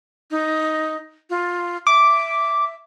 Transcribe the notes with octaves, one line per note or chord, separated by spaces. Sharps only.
D#4
F4
E5 D6